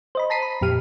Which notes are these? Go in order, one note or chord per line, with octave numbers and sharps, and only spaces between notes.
C5 D#5 B5
A5 A#5 B6 C7 D#7
B5
F2 A#2 G4 F6 D#7